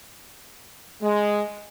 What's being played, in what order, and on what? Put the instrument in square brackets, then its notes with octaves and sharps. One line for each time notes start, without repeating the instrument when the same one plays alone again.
[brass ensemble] G#3